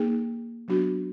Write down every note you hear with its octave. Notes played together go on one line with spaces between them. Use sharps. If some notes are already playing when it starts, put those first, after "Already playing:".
Already playing: A#3 D#4 G#4
F#3 B3 D4 F#4